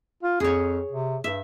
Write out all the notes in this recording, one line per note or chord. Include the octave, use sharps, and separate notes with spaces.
F4
F2 G#4 C#5
C3
G2 E5